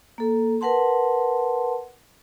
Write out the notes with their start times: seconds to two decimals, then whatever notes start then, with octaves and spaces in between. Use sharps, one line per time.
0.18 A#3 A4
0.61 A#4 B4 F#5 A5 C6